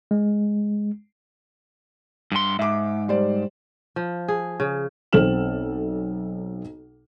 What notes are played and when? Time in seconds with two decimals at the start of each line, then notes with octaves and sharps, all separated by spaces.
0.11 G#3
2.32 G2 C6
2.59 G#2 E5 D6
3.08 G3 C5 D5
3.96 F3
4.28 G#4
4.60 C#3
5.13 B1 C4 A4 F6 E7 F#7